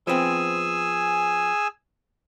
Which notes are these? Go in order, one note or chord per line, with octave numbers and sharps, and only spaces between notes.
F3 B3 C4 G#4 G#5 E6